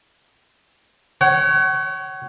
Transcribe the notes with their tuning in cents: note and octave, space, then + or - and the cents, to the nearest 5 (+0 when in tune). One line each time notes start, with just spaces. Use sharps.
C#5 +0 F#5 +40